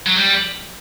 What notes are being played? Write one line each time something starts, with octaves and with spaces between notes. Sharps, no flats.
F#3
G3